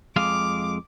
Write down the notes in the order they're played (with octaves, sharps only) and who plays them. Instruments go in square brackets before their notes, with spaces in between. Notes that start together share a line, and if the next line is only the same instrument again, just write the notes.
[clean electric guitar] F2 G#3 F5 [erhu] D6